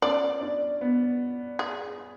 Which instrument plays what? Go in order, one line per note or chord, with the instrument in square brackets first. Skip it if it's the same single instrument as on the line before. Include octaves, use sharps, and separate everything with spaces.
[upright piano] C#4 [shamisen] D5
[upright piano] D4
B3
[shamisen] G#4